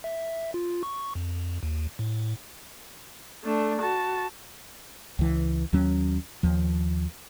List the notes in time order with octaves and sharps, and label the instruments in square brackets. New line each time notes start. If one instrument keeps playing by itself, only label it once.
[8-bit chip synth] E5
F4
C#6
F2
D#2
A2
[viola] A3 D4
F#4 A5
[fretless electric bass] C#2 E3
D#2 F#3 C#4
D#2 F3